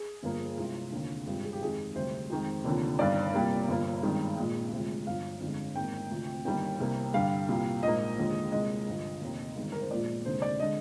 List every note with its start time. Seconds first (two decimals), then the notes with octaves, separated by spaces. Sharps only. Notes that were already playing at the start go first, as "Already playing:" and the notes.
Already playing: G#4
0.23 G1 G2 F3 A#3
0.57 C2 C3 F3 G#3 F4
0.92 F1 D#2 D3
1.26 G#1 G2 F3 G#3 G4
1.44 G#4
1.53 G4
1.61 F2 D#3 G#3 G#4
1.95 D2 C3 G3 C5
2.30 F2 D#3 G#3
2.64 F1 D#2 D3 F3
2.99 G1 G2 D#3 D5
3.34 C2 A#2 G3 A#3
3.68 G1 G2 F3 A#3
4.03 G#1 G2 D#3 G#3
4.37 A#1 A#2 G#3
4.71 D2 C3 F3 G#3
5.07 G1 G2 F3 F5
5.40 G1 F2 D3 G#3
5.75 G#1 G#2 D#3 A#3 G5
6.10 D2 C3 F3
6.45 G1 G2 D#3 G3 A#3 G5
6.80 C2 C3 G3 A#3
7.14 G2 D3 G3 F5
7.48 C2 A#2 G3
7.83 A#1 G#2 F3 A#3 D#5
8.18 D#2 D3 F3 G#3
8.52 C2 A#2 G#3 D#5
8.87 G2 D3 F3
9.21 F1 D#2 D#3
9.56 G1 G2 D#3 G#3
9.72 A#4
9.81 C5
9.91 A#1 A#2 F3 G#3 D5
10.24 F1 D#2 D3 G#3 C5
10.42 D5
10.60 D3 G#3 D#5